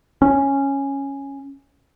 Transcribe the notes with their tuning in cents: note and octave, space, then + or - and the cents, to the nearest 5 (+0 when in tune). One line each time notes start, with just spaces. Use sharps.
C#4 -5